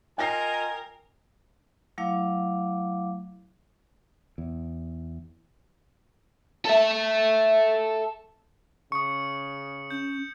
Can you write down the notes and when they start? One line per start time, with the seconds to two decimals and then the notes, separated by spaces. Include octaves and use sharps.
0.18 F4 A#4 D#5 G5 G#5 A#6 C7
1.98 F#3 A3 E4 F5 D6
4.38 E2
6.65 A4 E5
8.92 C#3 C#6 D#6 C#7
9.91 C#4 G6